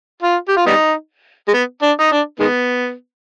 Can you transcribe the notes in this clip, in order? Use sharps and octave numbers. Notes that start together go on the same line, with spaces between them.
F4
G4
F4
G3 B3 D#4
G#3
B3
D4
D#4
D4
D#3 G#3 B3